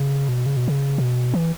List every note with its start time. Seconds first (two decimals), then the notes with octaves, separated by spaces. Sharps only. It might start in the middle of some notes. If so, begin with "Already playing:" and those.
Already playing: C#3
0.28 B2
0.46 C#3
0.57 B2
0.68 C#3
0.98 B2
1.34 E3